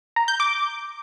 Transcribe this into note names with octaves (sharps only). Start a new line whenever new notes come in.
A#5
G6
D6